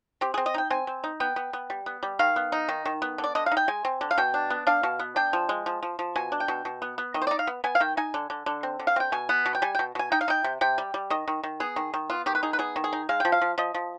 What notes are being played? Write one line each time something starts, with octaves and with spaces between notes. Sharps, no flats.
C4 G4
C4 G#4
D#5
D#4 G5
C4 G#5
C4
D#4
B3 G5
B3
B3
G3
B3
G3
D#3 F5
B3
D#4
D#3
D#3
B3
D3
D5
D3 D#5
F5
D#4
G5
G#3 G#5
C4
D3
F5
B2 G5
D4
B3
D4 F5
B2
B3
D4 G5
F3
G#3
F3
F3
F3
B2 G#5
D4
G5
B2
B2
B3
B3
D#3 D#5
C5
D5
D#4
F5
B3
B3 G#5
F5
D#3 G5
D#4 G#5
D3
D3
D3
C4
D3
F5
C4 G5
B2 G#5
B3
B2
G5
G3 G#5
G5
B2
B2 G#5
D#4 G5
F5
D#4 G5
C3
C3 G5
G3
G3
D#3 D#5
D#3
D#3
B3 G#4
D#3
D#3
B3 F4
D#3 G4
B4
D#4 G#4
B4
B3 G#4
D#3
G#4
D#4
G#3 F5
F3 G5
F5
F3
F3 D#5
F3